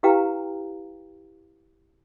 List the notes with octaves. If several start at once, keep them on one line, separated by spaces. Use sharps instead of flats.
E4 G4 B4 F5 G5 A#5